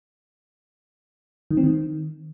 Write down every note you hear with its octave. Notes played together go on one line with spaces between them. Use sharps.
D#3
C4
D#3